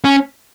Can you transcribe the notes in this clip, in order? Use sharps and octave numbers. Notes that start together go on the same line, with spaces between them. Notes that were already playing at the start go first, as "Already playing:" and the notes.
C#4